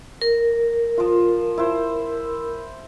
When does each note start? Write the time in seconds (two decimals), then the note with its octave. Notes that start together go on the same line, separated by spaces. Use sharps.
0.22 A#4
0.98 F3 F4
1.58 E4 C5